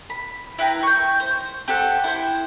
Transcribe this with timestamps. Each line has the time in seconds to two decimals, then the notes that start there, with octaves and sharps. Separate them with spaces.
0.10 B5
0.58 E4 B4 G5 A#5
0.83 C#6 G6
1.20 C5
1.68 C4 G4 A4 F#5
2.04 E4 C5